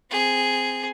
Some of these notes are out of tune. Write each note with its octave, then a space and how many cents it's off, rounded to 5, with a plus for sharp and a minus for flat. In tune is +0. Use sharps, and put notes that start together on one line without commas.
C4 -10 G#4 +0